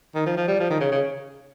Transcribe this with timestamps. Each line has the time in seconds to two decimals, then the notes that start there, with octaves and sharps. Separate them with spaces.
0.15 D#3
0.26 F3
0.37 F3
0.48 G3
0.59 F3
0.70 D#3
0.80 C#3
0.92 C#3